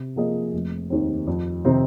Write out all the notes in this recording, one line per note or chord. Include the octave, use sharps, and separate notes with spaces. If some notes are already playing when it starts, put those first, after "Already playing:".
Already playing: C3
F3 A#3 G#4 D#5
F1
D#2 D#3 C4
F2
C3 D#3 C4 D#4